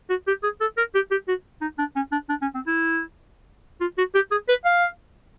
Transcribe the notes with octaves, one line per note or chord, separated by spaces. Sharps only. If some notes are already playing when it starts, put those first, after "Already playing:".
F#4
G4
G#4
A4
A#4
G4
G4
F#4
D#4
D4
C#4
D4
D4
C#4
C4
E4
F4
F#4
G4
G#4
B4
F5